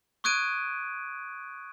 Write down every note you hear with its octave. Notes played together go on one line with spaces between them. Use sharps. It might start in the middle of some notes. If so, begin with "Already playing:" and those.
C#6 D#6 F#6 G#6 D7 D#7